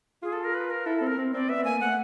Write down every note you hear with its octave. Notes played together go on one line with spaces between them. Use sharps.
F4 G#4
A4
A#4
B4
A#4
E4 A4
C4 A4
A#4
C4
C4 D5
B3 E5
A#3 G#5
A3 F#5